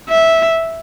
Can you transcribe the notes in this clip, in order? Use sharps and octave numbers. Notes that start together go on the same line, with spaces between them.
E5